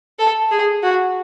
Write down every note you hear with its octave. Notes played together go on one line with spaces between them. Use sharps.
A4
G#4
F#4